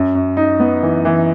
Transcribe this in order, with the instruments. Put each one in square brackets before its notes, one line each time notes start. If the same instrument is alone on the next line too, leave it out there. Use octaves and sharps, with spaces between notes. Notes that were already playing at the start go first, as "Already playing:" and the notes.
Already playing: [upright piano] F#2
F#2
D#4
B3
E3
E3